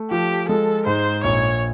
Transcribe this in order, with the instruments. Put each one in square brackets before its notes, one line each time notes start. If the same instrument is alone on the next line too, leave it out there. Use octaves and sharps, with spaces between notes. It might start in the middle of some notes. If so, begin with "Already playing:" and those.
Already playing: [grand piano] A3
[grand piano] F3 [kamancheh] G4
[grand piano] G#3 [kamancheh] A4
[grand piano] G#2 [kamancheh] C5
[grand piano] A#1 [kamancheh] C#5